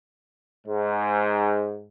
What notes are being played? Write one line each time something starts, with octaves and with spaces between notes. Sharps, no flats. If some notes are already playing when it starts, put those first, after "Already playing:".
G#2